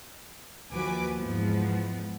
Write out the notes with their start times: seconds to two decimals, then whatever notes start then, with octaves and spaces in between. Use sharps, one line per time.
0.70 D#2 F3 F#4 B4 G#5 D6
1.18 E2 G#2 F3 B3